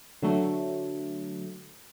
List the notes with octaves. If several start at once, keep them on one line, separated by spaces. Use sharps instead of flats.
D3 F#3 A3